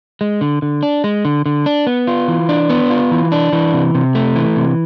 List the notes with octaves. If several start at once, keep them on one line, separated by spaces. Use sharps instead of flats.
G#3
D3
D3
D4
G#3
D3
D3
D4
B3
F4
E3
D4
B3
F4
E3
D4
E3
C3
C3
A3
E3
C3